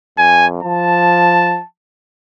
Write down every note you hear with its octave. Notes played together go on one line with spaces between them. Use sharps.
F2 G#5
F3 A5